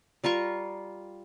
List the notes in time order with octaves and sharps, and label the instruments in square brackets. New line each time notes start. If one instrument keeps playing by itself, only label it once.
[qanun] G3 F4 A#4 C#6